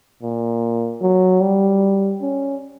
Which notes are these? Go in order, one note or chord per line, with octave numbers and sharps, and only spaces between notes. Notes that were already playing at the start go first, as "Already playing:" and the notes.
A#2
F#3
G3
C#4